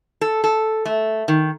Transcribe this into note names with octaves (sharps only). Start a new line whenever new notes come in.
A4
A4
A3
D#3